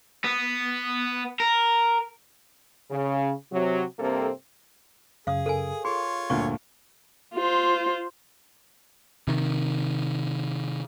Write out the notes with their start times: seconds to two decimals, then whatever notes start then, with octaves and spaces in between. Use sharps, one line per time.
0.24 B3
1.40 A#4
2.91 C#3
3.52 C3 F#3
3.99 G2 C3 A#3 C4 A4
5.27 F#2 C#3 G#4 F5 D#6
5.46 A4 A#4 G#5
5.85 F4 G#4 C#5 C6
6.30 D2 G2 A#2 C#6
7.35 F4 C5
9.28 C3 D#3